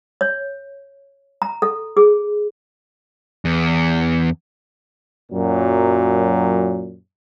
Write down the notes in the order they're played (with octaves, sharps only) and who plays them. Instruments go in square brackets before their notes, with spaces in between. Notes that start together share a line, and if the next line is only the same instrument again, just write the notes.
[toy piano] C#5
A#5
A4
G#4
[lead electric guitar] E2
[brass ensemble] F#2 A#2 F#3